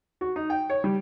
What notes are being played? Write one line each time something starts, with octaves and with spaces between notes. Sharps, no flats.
F#4
D#4
G5
C#5
G3